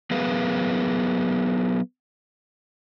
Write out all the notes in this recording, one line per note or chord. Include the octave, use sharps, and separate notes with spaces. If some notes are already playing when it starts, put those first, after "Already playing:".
F#3 B3 G#4 A#4 B4 F5